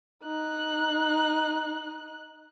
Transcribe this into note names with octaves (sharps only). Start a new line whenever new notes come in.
D#4 F#6